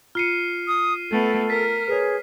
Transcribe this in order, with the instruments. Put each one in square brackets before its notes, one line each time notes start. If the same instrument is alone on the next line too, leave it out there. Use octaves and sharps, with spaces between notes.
[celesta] F4 C#7 [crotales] F6 C7 D#7
[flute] D#6
[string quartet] A3 B3 [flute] A4
[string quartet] A#4 [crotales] B6
[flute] G#4 [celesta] B4 C#5